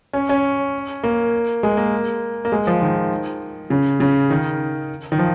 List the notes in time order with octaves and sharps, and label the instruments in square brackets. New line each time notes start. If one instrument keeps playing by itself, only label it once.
[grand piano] C#4
C#4
A#3
G#3
A#3
A#3
G#3
F3
D#3
C#3
C#3
D#3
D#3
F3